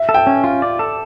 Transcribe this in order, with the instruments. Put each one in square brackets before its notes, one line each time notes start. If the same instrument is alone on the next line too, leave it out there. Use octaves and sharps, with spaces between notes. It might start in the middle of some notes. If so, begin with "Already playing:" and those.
Already playing: [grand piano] E5
[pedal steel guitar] A4
[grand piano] G5
[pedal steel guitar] C#4
F4
D5
A4